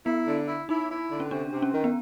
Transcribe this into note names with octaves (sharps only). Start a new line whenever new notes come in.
B3 E4
D3
E4
D#4 E4
E4
D3
C#4
C3 D4
C3
C#4
D#3
B3